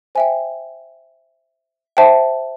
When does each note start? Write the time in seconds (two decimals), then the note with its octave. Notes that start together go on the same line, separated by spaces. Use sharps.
0.15 C5 E5 G5 G#5
1.97 C5 E5 G5 A5